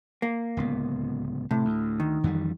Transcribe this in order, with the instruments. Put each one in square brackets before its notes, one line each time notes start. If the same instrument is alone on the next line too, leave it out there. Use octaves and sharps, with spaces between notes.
[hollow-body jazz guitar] A#3
[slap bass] D1 C#2 B3
[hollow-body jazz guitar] A2 [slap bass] C3
[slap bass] D2
[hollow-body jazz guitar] D#3
[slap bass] F2 E3 G3